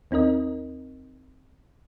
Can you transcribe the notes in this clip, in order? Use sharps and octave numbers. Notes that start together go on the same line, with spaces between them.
D#2 C4 D#4 A#4 D#5